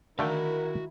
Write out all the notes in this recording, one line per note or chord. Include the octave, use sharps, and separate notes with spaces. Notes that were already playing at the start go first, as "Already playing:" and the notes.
D3 D#3 A3 E4 F#4 A#4 F5 G5